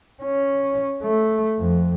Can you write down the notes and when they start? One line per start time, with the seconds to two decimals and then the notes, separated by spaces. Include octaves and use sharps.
0.23 C#4
1.03 A3
1.60 F2